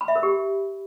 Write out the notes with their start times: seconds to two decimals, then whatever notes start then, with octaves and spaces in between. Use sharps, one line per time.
0.01 B5
0.08 E5
0.16 A#4
0.23 G4